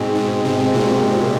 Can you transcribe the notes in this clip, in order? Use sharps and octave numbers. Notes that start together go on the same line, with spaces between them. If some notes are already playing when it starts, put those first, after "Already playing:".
Already playing: G#2 B2 G#3 C4
G#2
C3
A#2